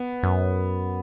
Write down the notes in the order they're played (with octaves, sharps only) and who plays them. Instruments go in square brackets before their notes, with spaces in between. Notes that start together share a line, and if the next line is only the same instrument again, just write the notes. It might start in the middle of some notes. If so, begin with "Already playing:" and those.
Already playing: [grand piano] B3
[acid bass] F#2